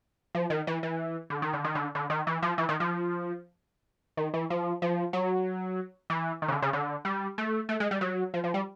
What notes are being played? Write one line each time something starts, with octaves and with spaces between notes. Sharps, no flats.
F3
D#3
E3
E3
D3
D#3
D3
D#3
D3
D3
D#3
E3
F3
E3
D#3
F3
D#3
E3
F3
F3
F#3
E3
D#3
C#3
D3
C#3
D3
G3
A3
A3
G#3
G3
F#3
F3
F3
G3